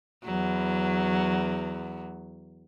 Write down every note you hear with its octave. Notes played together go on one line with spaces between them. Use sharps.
E2 F#3